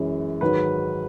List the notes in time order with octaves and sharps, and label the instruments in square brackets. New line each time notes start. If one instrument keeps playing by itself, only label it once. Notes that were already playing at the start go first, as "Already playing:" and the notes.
Already playing: [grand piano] F#2 E3 G#3
G#2 D#3 F#3 B4